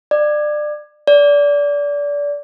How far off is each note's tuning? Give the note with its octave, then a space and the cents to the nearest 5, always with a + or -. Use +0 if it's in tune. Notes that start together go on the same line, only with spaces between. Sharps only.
D5 +25
D5 -25